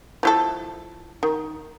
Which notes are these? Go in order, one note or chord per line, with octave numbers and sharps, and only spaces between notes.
F3 E4 A4
D#3